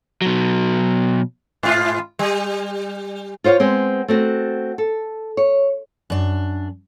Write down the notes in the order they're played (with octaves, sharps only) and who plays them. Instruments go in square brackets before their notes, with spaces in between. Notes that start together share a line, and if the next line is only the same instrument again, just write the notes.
[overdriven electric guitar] B2 F#3
[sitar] G#2 F4
G3
[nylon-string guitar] F4 C5 C#5 E5 F5
G#3 B3 C4
A3 C4 F#4
A4
C#5
[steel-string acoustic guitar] F#2 D4